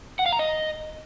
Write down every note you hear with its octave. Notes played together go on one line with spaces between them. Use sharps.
F#5
F5
A#5
D#5